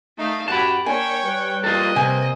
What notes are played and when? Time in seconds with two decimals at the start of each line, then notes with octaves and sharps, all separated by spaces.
0.19 A3 D#4 F5
0.48 F#2 G4 F#5 A5 B5
0.86 A#3 D4 C#5 G5 G#5
1.24 G3 B4
1.64 A#3 F4 A4 D#5
1.96 C3 G#5